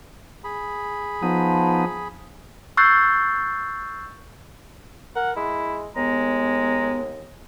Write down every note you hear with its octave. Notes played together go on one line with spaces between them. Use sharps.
G#4 B5
F3 B3 D#4
C#6 E6 F#6 G6 A6 C7
A#4 F#5
G#3 E4
D#2 G#3 B3 A#5